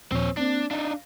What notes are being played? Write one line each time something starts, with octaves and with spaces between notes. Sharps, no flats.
D#2 A#2 F3 C4 C#5
A#3 C4 D4
D4 D#4 F5